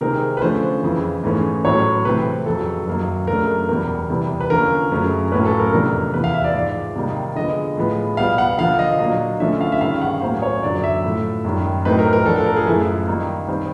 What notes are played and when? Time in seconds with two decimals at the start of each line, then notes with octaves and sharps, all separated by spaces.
0.01 C3 D#3 G#3 C4 D#4 A#4
0.37 B4
0.42 D3 F3 A3 C#4 C5
0.83 F2 C#3 E3
1.24 G#2 E3 A3 C#4
1.65 A2 F#3 A3 C#5
2.05 C3 E3 A3 C4 B4
2.46 F2 C#3 F#3 A4
2.87 F#2 D#3 F#3 A#3 D#4
3.27 F#2 C#3 F#3 A3 D4 A#4
3.69 E2 B2 G3 A#4
4.10 E2 C3 E3 G3
4.40 B4
4.50 D3 F3 A#3 C#4 A#4
4.92 F#2 C#3 F#3 A3 C#4
5.32 A2 F#3 A#3 C#4 B4
5.45 A4
5.59 A#4
5.73 F2 C3 E3 A3 D4 A#4
6.13 E2 C3 E3 B4
6.24 F5
6.34 E5
6.44 D5
6.54 G#2 F3 G#3 D5
6.96 C3 D#3 G3 A#3 D#4
7.35 D3 F3 G#3 B3 D#5
7.77 A2 F3 G#3 B3
8.17 B2 G3 B3 F5
8.38 F#5
8.58 D3 F3 A#3 F5
8.79 D#5
8.99 A#2 F#3 A#3 D4 D#5
9.40 D3 F3 A3 C#4 E5
9.61 F5
9.72 E5
9.81 G2 D#3 G#3 C#4 F5
10.01 F#5
10.22 A2 F#3 A#3 C#4 C5
10.42 C#5
10.62 F#2 D3 F#3 D5
10.84 E5
11.03 A2 F3 A3
11.45 F#2 D#3 G3
11.85 A2 F#3 A3 C4 D#4 B4
11.99 A#4
12.13 A#4
12.26 A2 F3 A3 D4 A4
12.36 A4
12.46 A#4
12.56 G#4
12.67 F#2 C#3 F3 A3 E4
13.08 D#3 G3 A#3 D#4
13.48 D#3 G3 C4